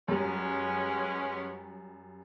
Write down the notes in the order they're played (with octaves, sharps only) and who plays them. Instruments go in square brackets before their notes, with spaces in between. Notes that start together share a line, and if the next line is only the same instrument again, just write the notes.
[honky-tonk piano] F#2 G3 [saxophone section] G#3 B3 C#4